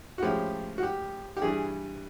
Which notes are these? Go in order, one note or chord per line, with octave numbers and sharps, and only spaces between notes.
F#4
A2 F3 G#3 C#4 G4
F#4
G4
G4
G2 E3 G3 G#4